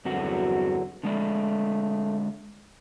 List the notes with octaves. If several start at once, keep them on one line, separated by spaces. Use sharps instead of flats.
E2 G2 D3 F#3 C4 F#4
D3 G#3 A3 D5